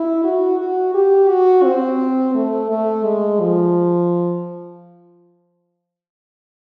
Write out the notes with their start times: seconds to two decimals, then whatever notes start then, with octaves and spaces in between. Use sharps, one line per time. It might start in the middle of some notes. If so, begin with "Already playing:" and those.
Already playing: E4
0.24 F#4
0.59 F#4
0.94 G4
1.29 F#4
1.64 C4
2.35 A3
2.70 A3
3.05 G#3
3.40 F3